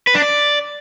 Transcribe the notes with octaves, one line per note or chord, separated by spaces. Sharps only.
B4
D4
D5